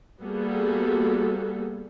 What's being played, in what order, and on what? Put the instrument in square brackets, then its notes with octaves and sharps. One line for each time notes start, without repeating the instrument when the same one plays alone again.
[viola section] G3 A#3 B3 F#4 G#4 A4